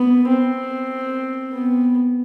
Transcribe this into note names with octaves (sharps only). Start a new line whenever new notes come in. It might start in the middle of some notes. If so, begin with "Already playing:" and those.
Already playing: B3
C4
B3